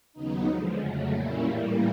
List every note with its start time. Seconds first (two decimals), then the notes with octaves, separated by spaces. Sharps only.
0.13 D#2 C#3 F#3 B3 D#4
0.46 D3 F3 G#3
0.79 F2 C#3 F#3 A3
1.11 A#2 G3 A#3 C#4 E4
1.43 A2 E3 G3 A#3